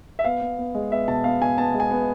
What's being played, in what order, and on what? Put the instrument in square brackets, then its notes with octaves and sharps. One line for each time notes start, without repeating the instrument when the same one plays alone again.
[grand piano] E5
B3 F5
B3
B3
G#3
B3 E5
B2 A5
B3 F5
B2 G#5
B3 A5
G#3
G#5
B3